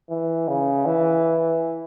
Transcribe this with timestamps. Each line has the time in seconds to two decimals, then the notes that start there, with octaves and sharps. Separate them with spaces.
0.10 E3
0.48 C#3
0.86 E3